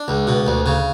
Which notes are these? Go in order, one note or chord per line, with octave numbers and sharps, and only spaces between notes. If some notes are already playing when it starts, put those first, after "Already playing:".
Already playing: D4
C#2
B2
D2
C#3